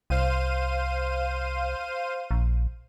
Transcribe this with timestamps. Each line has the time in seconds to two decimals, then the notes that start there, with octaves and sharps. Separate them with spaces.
0.10 C2 C5 F5 D#7
2.31 A#1